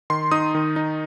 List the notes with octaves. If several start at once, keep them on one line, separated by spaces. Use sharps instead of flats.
D#3 C6
D#4 D#6
D#3
D#4